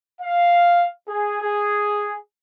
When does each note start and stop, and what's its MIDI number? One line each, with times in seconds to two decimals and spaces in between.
0.21 0.85 77
1.08 1.40 68
1.42 2.14 68